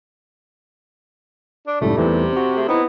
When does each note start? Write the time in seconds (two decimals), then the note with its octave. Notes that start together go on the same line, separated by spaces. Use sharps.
1.67 D4
1.81 C#2 F#2 A2 G3 A3 D#4
1.97 E2 C3 E3 A3
2.32 C4 F#4
2.56 A3 G#4
2.69 B3 C4 D#4 E4